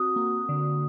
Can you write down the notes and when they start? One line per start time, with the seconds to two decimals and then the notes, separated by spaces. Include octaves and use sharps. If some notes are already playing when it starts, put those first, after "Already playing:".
Already playing: C4 F#4 D#6
0.16 A#3
0.49 D3